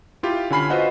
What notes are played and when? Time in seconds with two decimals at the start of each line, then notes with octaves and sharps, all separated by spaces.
0.23 E4 F4 G4
0.50 D3 C#4 G#5 B5 F6 C7
0.70 F4 F#4 B4 C5 D#5 F#5